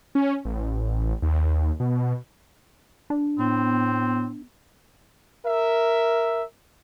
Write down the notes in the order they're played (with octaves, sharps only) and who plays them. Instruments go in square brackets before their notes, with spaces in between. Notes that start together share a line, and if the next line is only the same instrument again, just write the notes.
[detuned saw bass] C#4
A1
D#2
B2
[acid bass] D4
[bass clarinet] A2 [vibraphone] B3 [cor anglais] C4
[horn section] A#4 E5